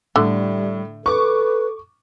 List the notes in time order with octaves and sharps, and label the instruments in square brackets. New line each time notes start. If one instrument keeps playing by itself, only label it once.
[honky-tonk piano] A2 [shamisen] D3 [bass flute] G3
[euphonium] A4 [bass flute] B4 [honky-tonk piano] C#6 D6